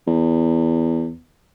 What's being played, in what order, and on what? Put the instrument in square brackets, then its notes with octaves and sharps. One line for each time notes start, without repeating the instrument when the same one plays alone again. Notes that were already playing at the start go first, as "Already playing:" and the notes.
[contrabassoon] E2